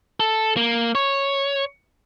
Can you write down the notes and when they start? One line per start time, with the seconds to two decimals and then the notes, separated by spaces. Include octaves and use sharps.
0.20 A4
0.57 A#3
0.95 C#5